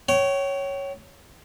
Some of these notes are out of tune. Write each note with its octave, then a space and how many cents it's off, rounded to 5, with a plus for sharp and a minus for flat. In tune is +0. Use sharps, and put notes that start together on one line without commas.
C#5 +0 G5 -40